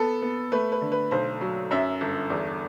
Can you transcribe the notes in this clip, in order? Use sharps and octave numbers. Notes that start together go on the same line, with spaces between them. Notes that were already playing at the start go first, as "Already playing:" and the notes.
Already playing: B3 A4
B3
A3 B4
B4
D3
B4
B1 C5
F#3
F#2 E5
G1
E2